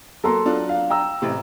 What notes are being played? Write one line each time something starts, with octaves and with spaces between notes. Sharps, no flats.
F#3 A#3 A4 A#5 C6
F#3 D4 F4
F5
G5 A#5 E6
A1 A2 C3